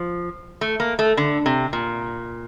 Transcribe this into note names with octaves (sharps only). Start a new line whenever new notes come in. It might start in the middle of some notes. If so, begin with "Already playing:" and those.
Already playing: F3
A3
A#3
A3
D3
C3
A#2